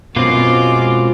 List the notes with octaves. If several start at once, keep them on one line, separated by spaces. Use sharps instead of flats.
F#2 B2 G#3 C4 F4 D6